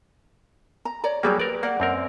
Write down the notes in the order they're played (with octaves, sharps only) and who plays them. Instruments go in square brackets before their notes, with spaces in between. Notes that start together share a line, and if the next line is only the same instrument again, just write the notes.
[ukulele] A#5
C#5 D5 A#5
[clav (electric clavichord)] F#3 G3 A#3 [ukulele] G4 G#4 C#5
[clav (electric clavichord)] A#4 D5 [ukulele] B4
[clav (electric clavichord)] A#3 [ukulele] D5 F#5
[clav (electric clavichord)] F#2 C4 A#4